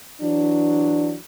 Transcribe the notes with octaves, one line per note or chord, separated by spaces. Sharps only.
E3 F#3 D4